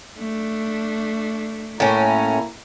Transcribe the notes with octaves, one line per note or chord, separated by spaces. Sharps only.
A3 D4
A2 A#3 C#4 E4 A#5